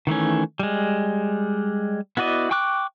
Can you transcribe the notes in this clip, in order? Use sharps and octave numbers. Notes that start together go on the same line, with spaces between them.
D#3 E3 A3 C#4
G3 G#3
B3 E4 F#4 D5 D#5
G5 C#6 D6 F#6